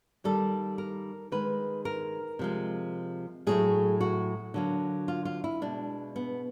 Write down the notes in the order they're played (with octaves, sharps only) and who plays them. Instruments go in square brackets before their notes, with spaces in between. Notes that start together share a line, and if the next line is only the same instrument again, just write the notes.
[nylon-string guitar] D#3 G3 A#3 A4
A#4
D#3 G#3 B4
A#4
C3 F3 G#3
A2 F#3 A3 G#4
F#4
D3 F#3 A#3
F4
F4
E4
B2 G#3 D4
B3